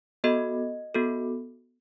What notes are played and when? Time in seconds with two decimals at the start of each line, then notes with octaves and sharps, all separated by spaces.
0.24 B3 F#4 A4 D#5
0.94 B3 F#4 A4